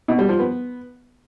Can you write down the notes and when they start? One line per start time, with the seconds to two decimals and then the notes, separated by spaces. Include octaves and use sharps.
0.08 B2
0.19 G3
0.29 F3
0.39 B3